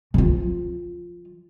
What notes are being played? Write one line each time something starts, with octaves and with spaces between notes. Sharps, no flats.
F3 F4